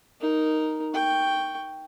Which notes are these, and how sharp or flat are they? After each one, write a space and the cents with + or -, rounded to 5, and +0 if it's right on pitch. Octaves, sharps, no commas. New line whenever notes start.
D#4 +0 A#4 +0
G5 +0 C#6 +5